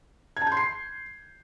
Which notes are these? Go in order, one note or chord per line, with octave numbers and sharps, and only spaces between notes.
G#6
A5
G6
C6
C7